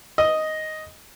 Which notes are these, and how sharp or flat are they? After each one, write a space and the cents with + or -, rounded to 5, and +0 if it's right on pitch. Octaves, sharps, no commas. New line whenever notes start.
D#5 +5